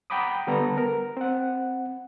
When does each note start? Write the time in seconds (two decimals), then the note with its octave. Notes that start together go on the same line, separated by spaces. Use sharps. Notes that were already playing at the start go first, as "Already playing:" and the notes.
0.10 F#5 G5 A#5 B5 D6 D#6
0.47 D3 G3 B3 A4 A#5
0.78 A#4
1.17 C4 F#5